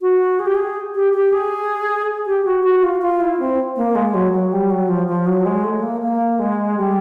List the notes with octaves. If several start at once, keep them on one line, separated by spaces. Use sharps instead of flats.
F#4
G#4
G4
G#4
G4
G4
G#4
G4
F#4
F#4
F4
F4
E4
C4
A#3
G#3
F#3
F#3
G3
F#3
F3
F3
F#3
G#3
A3
A#3
A#3
G#3
G3